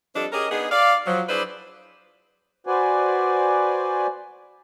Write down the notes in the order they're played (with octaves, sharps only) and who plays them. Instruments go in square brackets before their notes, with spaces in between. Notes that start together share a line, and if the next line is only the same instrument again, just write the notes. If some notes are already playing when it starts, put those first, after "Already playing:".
[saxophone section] F3 G3 C4 D4 A4 D#5
C#4 G4 G#4 A#4 D#5
B3 D4 D#4 G#4
D5 F5
F3 F#3
D4 E4 G#4 B4 C5 D5
[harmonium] F#4 B4 C5 D5 G#5